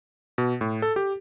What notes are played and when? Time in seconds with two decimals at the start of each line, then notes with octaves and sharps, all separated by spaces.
0.38 B2
0.61 A2
0.82 A4
0.96 G4